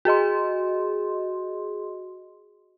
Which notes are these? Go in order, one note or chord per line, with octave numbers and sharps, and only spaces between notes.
F#4 G#4 D#5 C6